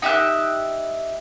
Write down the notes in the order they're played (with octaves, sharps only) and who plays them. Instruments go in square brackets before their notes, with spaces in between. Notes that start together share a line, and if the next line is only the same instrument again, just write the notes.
[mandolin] D#4 G4 E5 F#6